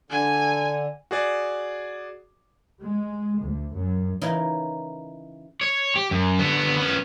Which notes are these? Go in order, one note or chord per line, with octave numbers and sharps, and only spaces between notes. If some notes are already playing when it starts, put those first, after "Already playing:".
D3 G#5
F#4 G#4 D5
G#3
D2
F#2
C#3 E3 D#4 A#4
C#5
G4
F#2
D3 B3
B3 C#4